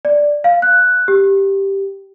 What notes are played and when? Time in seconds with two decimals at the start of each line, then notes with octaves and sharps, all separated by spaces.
0.05 D5
0.44 F5
0.62 F#6
1.08 G4